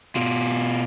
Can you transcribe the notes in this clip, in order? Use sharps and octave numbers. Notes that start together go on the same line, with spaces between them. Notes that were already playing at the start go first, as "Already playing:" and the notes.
B2 F4